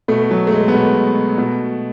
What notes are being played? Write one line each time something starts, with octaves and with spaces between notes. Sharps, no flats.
B2 A3
F#3
A3
G#3
B3
B2 A3
B2